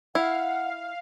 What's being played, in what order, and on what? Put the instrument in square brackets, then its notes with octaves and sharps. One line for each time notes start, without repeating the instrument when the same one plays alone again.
[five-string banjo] E4 [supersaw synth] F5 [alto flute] F#5